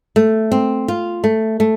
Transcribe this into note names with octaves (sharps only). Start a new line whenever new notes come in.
A3
C4
F4
A3
A3